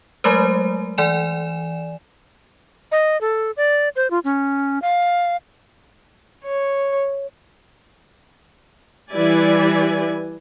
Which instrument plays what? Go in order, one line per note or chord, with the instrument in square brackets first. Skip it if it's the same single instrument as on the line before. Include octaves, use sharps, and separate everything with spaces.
[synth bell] F#3 G#3 A3 A#4 C5
E3 D5 G#5 E7
[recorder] D#5
A4
D5
C5
F4
C#4
F5
[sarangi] C#5
[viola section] E3 G3 E4 B4 D5 G#5